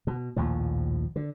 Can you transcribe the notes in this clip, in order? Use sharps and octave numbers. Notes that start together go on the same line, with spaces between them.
B2
A#1 D#2 A2 F3
D3